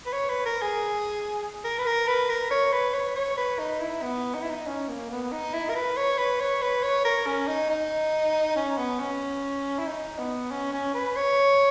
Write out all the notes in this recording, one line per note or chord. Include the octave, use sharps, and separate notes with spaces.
B4
C#5
B4
A#4
G#4
A#4
B4
A#4
B4
A#4
C#5
B4
C#5
C#5
B4
D#4
E4
B3
D#4
E4
D#4
C#4
A#3
B3
D#4
E4
A#4
B4
C#5
B4
C#5
B4
C#5
A#4
C#4
D#4
D#4
C#4
B3
C#4
E4
D#4
B3
C#4
C#4
B4
C#5